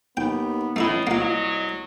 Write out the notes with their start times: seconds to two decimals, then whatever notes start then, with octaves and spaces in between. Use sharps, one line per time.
0.17 D#2 B3 G5
0.76 A1 A2 A3 D#4 E4 D#5
1.07 C2 F#3 A#3 F4